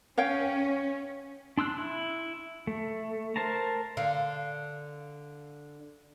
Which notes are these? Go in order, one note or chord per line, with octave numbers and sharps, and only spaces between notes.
C#4 C#5 F5 G5
D4 C6 E6 F#6
E4
A3
A#4 C5 A5 A#5
D3 F5